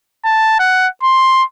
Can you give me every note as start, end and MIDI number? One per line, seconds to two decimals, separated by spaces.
0.25 0.59 81
0.59 0.87 78
1.03 1.43 84